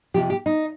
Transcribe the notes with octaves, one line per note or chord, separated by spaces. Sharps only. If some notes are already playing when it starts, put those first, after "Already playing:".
F2 C3 F3 G4
G4
D#4